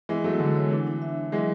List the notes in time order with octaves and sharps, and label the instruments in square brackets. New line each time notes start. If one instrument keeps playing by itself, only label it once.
[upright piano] E3 G#3 [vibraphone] B3
[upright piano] F#3 A3 [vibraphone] B3
[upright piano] D3 [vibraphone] G#3
[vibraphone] C#5
[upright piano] E3 [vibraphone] D4
[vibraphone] D4
E5
D4
[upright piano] E3 G#3 [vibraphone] F#3